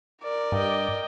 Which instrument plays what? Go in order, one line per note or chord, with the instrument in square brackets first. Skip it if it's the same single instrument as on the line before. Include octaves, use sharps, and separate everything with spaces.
[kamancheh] A#4 D5
[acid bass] G2 [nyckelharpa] D#5 G5